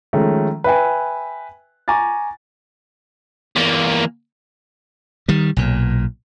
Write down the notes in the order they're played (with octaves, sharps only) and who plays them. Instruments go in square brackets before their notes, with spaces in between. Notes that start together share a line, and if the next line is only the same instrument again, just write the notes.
[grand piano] D#3 F3 G#3 A3 C#4
B4 E5 G5 G#5
G#5 A#5 C#6 D6 A6
[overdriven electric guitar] E2 A#3
[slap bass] D#3 G3
B1 A#2